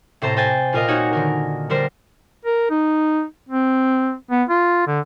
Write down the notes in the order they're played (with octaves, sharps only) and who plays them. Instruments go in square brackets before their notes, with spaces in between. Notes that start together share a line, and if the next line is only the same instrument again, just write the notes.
[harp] A2 C3 C5 A5 A#5
C5 G5 G#5 A6
A#2 F4 A#4 D#5 F5
A#3 D#4 F#4 C#5 F#5 G#5
D3 D#3 A#4
D3 G3 A#4 C5
[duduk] A#4
D#4
C4
B3
F4
D3